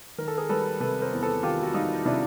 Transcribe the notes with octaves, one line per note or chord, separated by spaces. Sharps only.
D#3 A#4
A4
G#4 A#4
G3 A4 B4
C3 A4 B4
A#4 C5
E2
A4 B4
D#3 F4 G4
F#4
G3 D#4 F4
C3 D4 E4